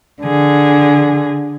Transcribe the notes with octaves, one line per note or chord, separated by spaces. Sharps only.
D3 G#4